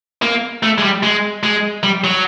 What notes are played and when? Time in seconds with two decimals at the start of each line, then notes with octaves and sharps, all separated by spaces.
0.22 A#3
0.63 A3
0.78 G#3
0.83 G3
1.03 G#3
1.43 G#3
1.83 G3
2.04 F#3